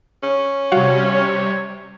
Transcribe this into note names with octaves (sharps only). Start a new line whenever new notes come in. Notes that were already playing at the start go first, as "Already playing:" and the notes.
C#4
C3 G3 F#4 C#5 F5 F#5